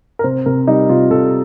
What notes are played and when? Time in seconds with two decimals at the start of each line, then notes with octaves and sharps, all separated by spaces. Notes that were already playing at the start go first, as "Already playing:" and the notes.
0.19 A#4
0.24 C3 C5
0.46 C3 A#4
0.67 G3 D#4
0.89 C3 F4
1.11 C3 A4